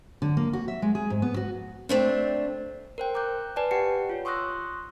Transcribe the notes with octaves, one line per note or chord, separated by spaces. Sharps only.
D3
A#3
F#4
E5
G#3
G#4
G#2
B3
F#4
A3 C4 D4
A#4 C5 G5
A#5 D6 F#6 G6
B4 D5 G#5 A5
G4 F#5 G5 C7 C#7
F4 C#5
C6 C#6 D#6 E6 F#6 A#6